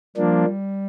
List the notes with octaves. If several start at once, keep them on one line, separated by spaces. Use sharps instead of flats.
F3 G3 A#3 D4